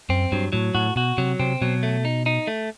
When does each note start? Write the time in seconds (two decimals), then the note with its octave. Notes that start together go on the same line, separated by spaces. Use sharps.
0.09 F#2 C4
0.32 G2 F#3
0.53 A2 F#3
0.75 A2 F#4
0.96 B2 F#4
1.18 C3 F#3
1.40 C3 C4
1.62 B2 F#3
1.83 A3
2.05 D#4
2.26 D#4
2.47 A3